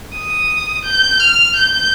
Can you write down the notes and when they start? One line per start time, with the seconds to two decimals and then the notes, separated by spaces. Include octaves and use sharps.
0.13 D#6
0.85 G6
1.20 F6
1.56 G6